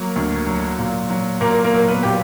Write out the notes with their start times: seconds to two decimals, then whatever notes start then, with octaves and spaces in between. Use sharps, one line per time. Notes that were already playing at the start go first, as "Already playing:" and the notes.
Already playing: F#3 A#3 A#4
0.16 D2
0.47 F#3
0.78 A#2
1.10 F#3
1.41 A#2 A#3 A#4
1.64 A#3 A#4
1.73 F#3
1.89 B3 B4
2.03 A#2 G4